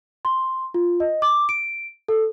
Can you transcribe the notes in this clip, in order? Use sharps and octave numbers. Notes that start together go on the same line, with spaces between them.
C6
F4
D#5
D6
D7
A4